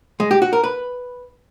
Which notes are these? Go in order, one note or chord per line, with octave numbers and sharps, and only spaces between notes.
G#3
G4
F#4
A#4
B4